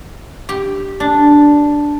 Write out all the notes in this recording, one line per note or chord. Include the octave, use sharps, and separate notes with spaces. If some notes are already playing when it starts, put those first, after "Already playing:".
G4
D4